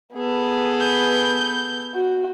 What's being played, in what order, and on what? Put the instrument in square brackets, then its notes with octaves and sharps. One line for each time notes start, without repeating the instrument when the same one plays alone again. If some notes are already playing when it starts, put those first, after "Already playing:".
[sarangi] B3 [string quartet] G#4 A4 B4
[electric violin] G6
[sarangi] F#4